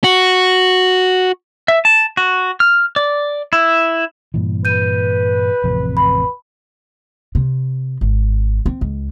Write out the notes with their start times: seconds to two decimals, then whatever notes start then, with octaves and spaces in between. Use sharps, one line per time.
0.04 F#4
1.68 E5
1.85 A5
2.17 F#4
2.60 F6
2.96 D5
3.53 E4
4.34 G2 A#2 E3
4.65 B4 G6 D#7
5.64 A1 F2 C3
5.97 B5
7.35 C3
8.01 G#1
8.66 C4
8.81 C#2